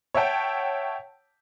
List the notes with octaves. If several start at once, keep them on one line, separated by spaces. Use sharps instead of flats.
C#5 E5 F#5 G5 A5